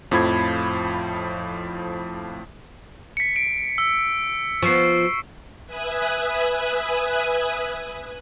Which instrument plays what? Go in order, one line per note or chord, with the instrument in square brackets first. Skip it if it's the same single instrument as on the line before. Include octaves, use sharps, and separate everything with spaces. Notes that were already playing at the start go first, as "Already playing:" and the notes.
[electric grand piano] F2 A2 F3 B5 G#6
[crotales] B6 C#7
D7
E6
[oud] F3 B3 [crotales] C#6 C7
[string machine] B4 E5 G#5 D#6 F#6